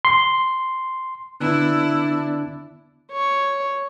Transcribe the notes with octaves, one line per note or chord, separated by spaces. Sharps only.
C6
D3 B3 D4 E4 F#6
C#5